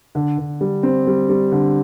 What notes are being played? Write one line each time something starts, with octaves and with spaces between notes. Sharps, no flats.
D3
D3
G3
C4
G3
G3
D3